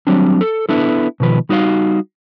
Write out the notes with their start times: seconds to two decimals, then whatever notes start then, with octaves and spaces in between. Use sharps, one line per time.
0.07 F#3 G3 C4 D4
0.41 A4
0.69 B3 D4 E4 A4
1.20 B2 D#3 F3 B4
1.49 G3 D#4 F#4 C#5 F5